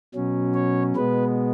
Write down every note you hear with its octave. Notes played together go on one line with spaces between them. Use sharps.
B2 F#3 C#4
C#5
B2 G#3 B3 B4